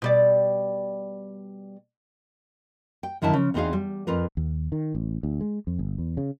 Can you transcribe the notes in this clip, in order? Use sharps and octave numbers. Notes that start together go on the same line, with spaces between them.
B2 G3 D5
G5
F#2 D3 D#3 E4 E5 A5
C#3 F3
E2 E3 C4 D#4 G#4 F5
G3
F2 F4 A#4 B4
D#2
D#3
A1
D2
G#3
F2
G1
E2
C#3